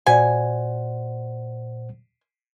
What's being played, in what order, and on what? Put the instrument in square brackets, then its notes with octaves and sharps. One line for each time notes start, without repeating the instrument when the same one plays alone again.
[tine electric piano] A#2 C5 F#5 [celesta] F#4 D5 [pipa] G#5